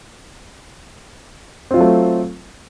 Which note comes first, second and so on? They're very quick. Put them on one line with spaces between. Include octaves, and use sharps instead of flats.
C4 F4 F#3 A3